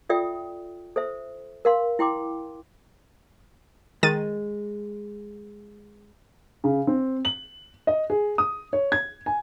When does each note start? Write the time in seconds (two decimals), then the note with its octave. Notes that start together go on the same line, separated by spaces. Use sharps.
0.09 F4 A4 D5 E5 G5 D#6
0.96 A4 C5 E5
1.65 A#4 F5 C6
1.99 E4 G5 C6 D6
4.03 D#3 G#3 A6 D#7
6.64 C#3
6.87 C4
7.25 F#7
7.87 D#5
8.10 G#4
8.38 D#6
8.73 C#5
8.92 G#6
9.26 G#5